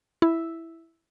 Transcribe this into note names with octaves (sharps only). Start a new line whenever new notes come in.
E4